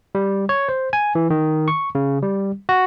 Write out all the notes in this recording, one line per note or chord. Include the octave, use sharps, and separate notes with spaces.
G3
C#5
C5
G#5
E3
D#3
C#6
C#3
G3
F#4